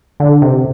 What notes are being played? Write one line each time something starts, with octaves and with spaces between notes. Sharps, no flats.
D3
C3